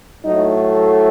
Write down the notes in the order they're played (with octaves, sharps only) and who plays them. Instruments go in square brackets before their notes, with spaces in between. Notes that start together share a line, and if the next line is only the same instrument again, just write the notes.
[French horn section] A2 F#3 A3 D#4